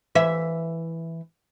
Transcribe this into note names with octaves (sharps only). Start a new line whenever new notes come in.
E3 E5